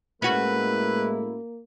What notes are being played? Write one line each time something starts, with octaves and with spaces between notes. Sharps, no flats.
A2 G#3 A#3 C#4 E4 F#4 B4